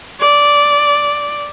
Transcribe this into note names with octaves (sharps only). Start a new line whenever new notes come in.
D5